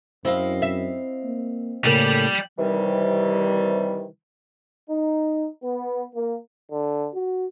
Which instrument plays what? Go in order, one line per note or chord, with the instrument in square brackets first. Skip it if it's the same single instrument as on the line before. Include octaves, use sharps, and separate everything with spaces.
[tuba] F#2 [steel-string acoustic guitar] C4 D#5 F5 [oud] E4
[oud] E5
[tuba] A#3
[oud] A2 C#3 A#4 [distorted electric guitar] G3 [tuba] A#3
[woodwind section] C3 D#3 E3 G3
[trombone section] D#4
B3
A#3
[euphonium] D3
F#4